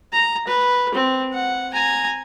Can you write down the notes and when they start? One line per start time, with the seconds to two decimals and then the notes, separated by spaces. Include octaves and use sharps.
0.13 A#5
0.47 B4
0.94 C4
1.33 F#5
1.73 G#5 A#5